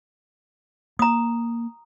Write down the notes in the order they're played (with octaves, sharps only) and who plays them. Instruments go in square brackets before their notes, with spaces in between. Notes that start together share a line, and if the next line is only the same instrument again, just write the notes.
[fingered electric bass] A#3 [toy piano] A#5 D#6